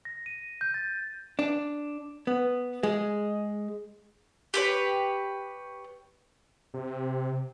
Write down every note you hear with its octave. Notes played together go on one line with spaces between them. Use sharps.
A#6
D#7
G6
A6
D4
B3
G#3
G4 B4 C#5
C3